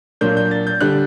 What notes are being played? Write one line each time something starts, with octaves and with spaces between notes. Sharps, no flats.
A#2 F#3 A#3 D4 G6
G6
A6
G6
D3 G3 D4 F#6